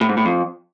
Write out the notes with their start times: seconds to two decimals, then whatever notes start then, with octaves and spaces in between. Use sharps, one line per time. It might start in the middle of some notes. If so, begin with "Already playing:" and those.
0.01 A2
0.09 G#2
0.17 A2
0.25 F2